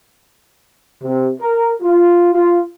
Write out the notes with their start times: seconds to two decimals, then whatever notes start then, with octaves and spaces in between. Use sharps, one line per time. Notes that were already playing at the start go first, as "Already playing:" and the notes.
1.02 C3
1.40 A#4
1.81 F4
2.34 F4